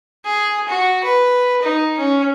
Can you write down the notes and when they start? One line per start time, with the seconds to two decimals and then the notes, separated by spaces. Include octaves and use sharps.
0.25 G#4
0.69 F#4
1.04 B4
1.63 D#4
1.99 C#4